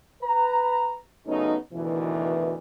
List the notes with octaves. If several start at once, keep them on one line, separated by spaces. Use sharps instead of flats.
B4 A#5
C#3 F#3 A3 B3 C#4 D#4
D2 B2 D#3 E3